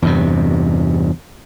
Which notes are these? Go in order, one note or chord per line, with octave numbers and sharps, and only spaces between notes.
E2 G2 C3